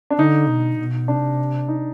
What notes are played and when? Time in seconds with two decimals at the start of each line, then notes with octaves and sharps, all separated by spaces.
0.10 D4
0.19 D3 D#4
0.48 B2
0.79 B2
1.08 C3 D4
1.68 D#4